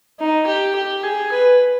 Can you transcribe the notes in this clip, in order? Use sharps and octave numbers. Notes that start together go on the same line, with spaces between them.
D#4
G4
G4
G#4
B4